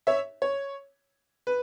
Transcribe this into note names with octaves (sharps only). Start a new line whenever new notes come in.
C#5 E5
C#5
B4